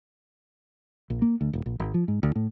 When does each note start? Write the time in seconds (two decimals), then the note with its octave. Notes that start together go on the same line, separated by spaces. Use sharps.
1.10 A#1
1.22 A#3
1.41 D2
1.53 D#1
1.66 A#1
1.80 G#1
1.94 F3
2.08 G#2
2.23 D2
2.36 A2